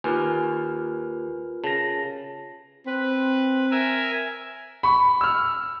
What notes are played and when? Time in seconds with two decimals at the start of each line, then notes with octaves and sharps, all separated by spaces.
0.04 D#2 F4 A#4 B4 G#5
1.64 C#3 A5 A#6
2.86 C4 B4
3.71 A#4 E5 G#5
4.83 B5 C#6
5.21 E6 F6